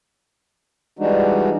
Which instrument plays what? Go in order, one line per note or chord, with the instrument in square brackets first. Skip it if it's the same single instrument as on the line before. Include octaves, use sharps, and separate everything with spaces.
[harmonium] E3 G3 G#3 D4 D#4 F#4